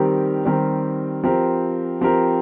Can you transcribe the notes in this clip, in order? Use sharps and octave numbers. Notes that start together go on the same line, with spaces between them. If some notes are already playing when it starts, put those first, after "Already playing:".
Already playing: D#3 G3 C4 G4 A#4
D#3 G3 C4 G4 A#4
F3 C4 G4 A#4
F3 C4 G4 A#4